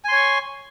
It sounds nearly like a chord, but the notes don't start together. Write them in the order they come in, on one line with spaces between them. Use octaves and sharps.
G#5 C6 C#5 C#6